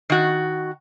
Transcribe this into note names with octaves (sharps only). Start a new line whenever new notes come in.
D#3 F#4